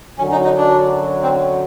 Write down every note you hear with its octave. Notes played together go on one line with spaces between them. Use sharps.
F#2 D3 F#3 C#4
D#4
D#4
D4
C4